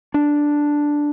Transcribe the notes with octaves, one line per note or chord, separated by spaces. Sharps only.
D4